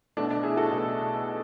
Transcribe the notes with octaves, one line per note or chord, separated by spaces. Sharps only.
B1 B2 A3 D4
D4
E4 G#4
F#4 A4
B1 B2 A3